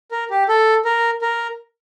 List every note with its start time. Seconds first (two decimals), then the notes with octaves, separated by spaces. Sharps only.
0.12 A#4
0.31 G4
0.49 A4
0.85 A#4
1.22 A#4